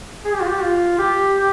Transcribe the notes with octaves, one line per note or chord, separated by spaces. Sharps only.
G#4
G4
F4
G4
F4
G4
G4